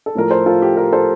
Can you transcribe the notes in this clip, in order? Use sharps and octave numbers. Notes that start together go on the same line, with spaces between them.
A4
A2 F3 A3 A#4
A4 C5
F4 A4
G4
G4 A#4
A4 C5